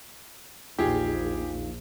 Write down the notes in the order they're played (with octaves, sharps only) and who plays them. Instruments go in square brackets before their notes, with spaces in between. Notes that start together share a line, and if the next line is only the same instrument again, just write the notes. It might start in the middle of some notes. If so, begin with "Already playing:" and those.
[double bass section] A#1 [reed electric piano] E2 D#4 F5 [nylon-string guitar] F4 [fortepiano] G4 G#4